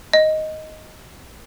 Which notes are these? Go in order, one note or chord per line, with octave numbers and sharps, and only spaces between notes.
D#5